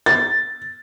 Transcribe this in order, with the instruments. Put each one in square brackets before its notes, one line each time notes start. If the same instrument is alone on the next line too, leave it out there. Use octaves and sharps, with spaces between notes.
[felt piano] A6